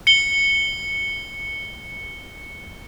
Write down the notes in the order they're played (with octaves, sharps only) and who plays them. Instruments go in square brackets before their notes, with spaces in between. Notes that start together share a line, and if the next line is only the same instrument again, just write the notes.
[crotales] C#7 G7